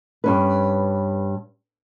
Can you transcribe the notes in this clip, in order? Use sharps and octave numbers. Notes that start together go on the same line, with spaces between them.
G2 C#4 B4